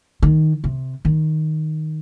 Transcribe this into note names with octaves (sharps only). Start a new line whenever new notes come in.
D#3
C3
D#3